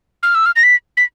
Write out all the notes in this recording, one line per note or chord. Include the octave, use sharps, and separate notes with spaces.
F6
E6
F6
A#6
B6
B6